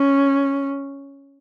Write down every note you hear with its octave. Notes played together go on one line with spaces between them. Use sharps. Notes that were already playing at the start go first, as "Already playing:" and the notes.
Already playing: C#4